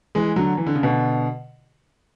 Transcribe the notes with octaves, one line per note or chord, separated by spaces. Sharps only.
E3 G#3
D3 F#3
E3
D3
C#3
B2 D3